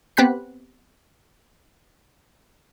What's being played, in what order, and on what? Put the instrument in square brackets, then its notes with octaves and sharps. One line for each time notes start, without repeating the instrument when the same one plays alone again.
[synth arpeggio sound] B3 C4 G4 B5 F#6 B6